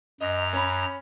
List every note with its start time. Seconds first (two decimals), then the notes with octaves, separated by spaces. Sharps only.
0.21 F#2 D#5 A#5
0.53 C#4 B5